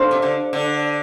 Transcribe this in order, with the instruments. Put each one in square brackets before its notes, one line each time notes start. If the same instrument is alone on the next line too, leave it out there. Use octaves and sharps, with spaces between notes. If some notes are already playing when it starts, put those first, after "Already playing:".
Already playing: [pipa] D4 A4 C5 F5
[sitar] C3
D3
D3